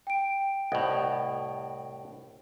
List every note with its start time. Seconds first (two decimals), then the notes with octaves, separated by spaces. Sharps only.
0.07 G5 D7
0.72 C2 A2 D#5 F#5